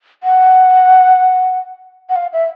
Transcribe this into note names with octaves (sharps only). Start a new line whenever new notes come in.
F#5
F#5
F5
E5